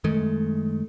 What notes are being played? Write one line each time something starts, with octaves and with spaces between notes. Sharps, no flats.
F#2 D#3 G#3 A3